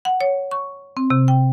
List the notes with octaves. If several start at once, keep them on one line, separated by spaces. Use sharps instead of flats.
F#5
C#5
C#6
C4
C3
G5